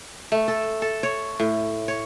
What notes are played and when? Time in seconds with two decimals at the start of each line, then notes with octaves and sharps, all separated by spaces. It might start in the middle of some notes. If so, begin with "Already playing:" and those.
0.32 A3
0.48 A4
0.82 A4
1.03 C#5
1.40 A2
1.88 C#5